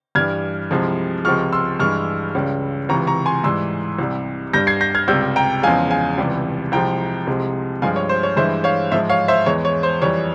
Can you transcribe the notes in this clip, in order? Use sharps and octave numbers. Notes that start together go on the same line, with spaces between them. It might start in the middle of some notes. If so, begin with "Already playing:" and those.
G2 E3 G3 F6 G#6
C2 C3 F3 G#3
C#2 C3 F3 G#3 C#6 F6
C6 E6
G2 E3 G#3 C#6 F6
C#2 C#3 G3
C#2 C3 E3 A#5 C#6
A#5 C#6
G#5 C6
G#2 E3 G3 C6 E6
C2 C3 G3
G2 G3 G6 A#6
G#6 C7
G6 A#6
F6 G#6
C#2 C3 G3 E6 G6
G5 A#5
E2 C#3 F3 G#3 F5 G#5
F5 G#5
C#2 C3 E3 G3
C2 C3 F3 G#3 G5 A#5
C2 C3 F3 G#3
G2 F3 G#3 F5 G#5
C#5
C5
C#5
G2 E3 G#3 C5 E5
C#5 F5
G#2 F3 G#3 C5 E5
C#5 F5
C5 E5
E2 E3 G#3 C#5
C#5
C5
F2 E3 G3 C#5